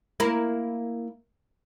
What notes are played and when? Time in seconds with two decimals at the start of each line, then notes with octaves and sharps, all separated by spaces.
0.20 A#3 E4